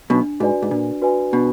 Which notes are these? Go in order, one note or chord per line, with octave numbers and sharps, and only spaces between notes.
B1 B2 D4
G#2 F#4 B4 D5 G#5
G#2
A#2 D4
F#4 B4 D5 G#5
B2 D4